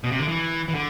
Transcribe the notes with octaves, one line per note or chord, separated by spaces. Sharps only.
B2
C3
D3
E3
E3
D3